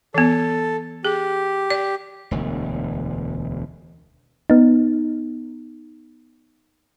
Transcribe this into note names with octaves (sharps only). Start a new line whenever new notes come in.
E3 B3 A4
G4 G#4
D5
E1 D2
B3 D#4